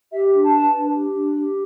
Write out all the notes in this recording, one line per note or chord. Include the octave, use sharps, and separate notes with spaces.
G4 E5
D4
A5
B4
D4
G4
D4
G4